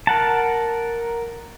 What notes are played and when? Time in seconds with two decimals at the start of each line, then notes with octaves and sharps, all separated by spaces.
0.07 A#4 F#5 A5